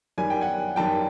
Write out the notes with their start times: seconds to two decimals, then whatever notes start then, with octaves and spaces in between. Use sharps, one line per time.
0.18 F#2 D#3 G3 G#5
0.30 G5
0.41 F#5 G#5
0.76 F#2 D#3 G3 G5 A5